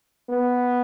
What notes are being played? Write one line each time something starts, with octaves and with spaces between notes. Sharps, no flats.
B3